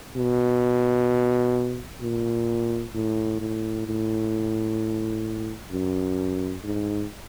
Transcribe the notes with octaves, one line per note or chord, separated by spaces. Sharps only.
B2
A#2
A2
A2
A2
F#2
G#2